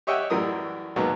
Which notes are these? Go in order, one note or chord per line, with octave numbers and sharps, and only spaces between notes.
G4 C#5 D#5 E5 F#5 G5
F#2 A2 E3 G3 A#4 D#6
D#2 B2 F#3 G#3 A#3 B3